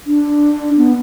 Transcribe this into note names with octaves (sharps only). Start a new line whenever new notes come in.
D4
B3